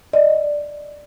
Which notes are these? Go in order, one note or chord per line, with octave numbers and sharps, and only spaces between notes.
D5 D#5